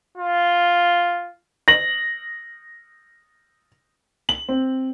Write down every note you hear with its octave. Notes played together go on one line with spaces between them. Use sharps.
F4
A#6 F#7
F#7
C4